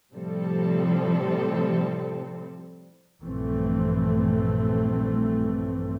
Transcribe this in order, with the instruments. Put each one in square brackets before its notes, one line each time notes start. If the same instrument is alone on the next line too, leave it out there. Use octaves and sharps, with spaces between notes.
[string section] A2 C3 F3 G3 C4 A4
[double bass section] A#1 G2 E3 A3 C4